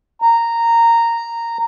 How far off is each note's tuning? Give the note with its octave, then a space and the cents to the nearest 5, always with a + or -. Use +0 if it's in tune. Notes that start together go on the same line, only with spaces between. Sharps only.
A#5 -10